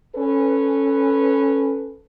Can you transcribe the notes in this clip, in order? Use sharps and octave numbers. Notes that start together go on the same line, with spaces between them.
C#4 A4 B4